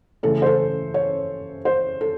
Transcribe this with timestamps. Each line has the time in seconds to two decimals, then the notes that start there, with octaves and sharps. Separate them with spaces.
0.23 C#3 E3 A3 C#4 A4
0.42 C5
0.46 A4
0.94 C#5
1.65 C5
2.01 A4